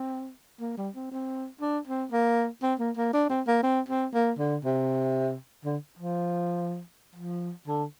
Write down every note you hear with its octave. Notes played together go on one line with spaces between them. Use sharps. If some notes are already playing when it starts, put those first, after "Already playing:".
Already playing: C4
A#3
G3
C4
C4
D4
C4
A#3
C4
A#3
A#3
D4
C4
A#3
C4
C4
A#3
D3
C3
D3
F3
F3
D3